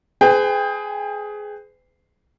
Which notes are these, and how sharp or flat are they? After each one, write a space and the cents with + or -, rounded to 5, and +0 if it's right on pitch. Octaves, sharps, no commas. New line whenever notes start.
G#4 +15 B4 +45 G5 +35